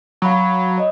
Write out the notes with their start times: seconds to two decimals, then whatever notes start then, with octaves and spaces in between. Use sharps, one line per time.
0.22 F#3 F5 B5 C#6
0.78 C#5 D#5